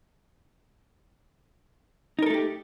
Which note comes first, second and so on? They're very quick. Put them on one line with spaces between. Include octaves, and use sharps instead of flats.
D#4 A#4 A4 A3 G4